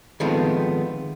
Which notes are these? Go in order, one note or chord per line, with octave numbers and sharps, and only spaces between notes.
D#3 F3 G#3 A3 B3 C4